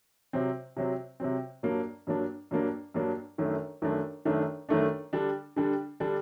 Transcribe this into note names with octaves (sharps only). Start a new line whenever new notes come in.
C3 F#3 C4
C3 F#3 C4
C3 F#3 C4
G2 F#3 A#3 D4
G2 F#3 A#3 D4
G2 F#3 A#3 D4
G2 F#3 A#3 D4
F#2 D#3 A3 D4
F#2 D#3 A3 D4
F#2 D#3 A3 D4
F#2 D#3 A3 D4
D3 G3 D4
D3 G3 D4
D3 G3 D4